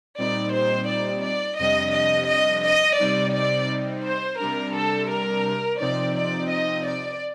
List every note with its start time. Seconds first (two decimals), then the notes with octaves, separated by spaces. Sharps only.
0.18 A#2 G3 C4 D#4 D5
0.54 C5
0.89 D5
1.24 D5
1.59 F2 C3 G3 D4 D#5
1.94 D#5
2.29 D#5
2.65 D#5
2.99 C3 G3 C4 D#4 D5
3.34 D5
4.05 C5
4.39 C3 G3 D4 A#4
4.75 A4
5.10 A#4
5.80 C3 F3 C4 D#4 D5
6.16 D5
6.51 D#5
6.86 D5